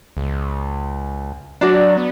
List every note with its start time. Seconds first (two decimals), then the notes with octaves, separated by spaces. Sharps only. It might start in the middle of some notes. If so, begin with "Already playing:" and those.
0.17 C#2
1.61 F#3 D4 F#4 D5
1.97 B3